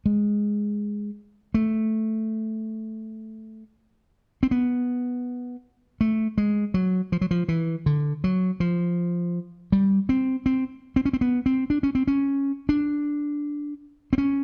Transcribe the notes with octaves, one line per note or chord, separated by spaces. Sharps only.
G#3
A3
C4
B3
A3
G#3
F#3
F3
F#3
F3
E3
D3
F#3
F3
G3
C4
C4
C4
C#4
C4
B3
C4
D4
C#4
C4
C#4
D4
C4
C#4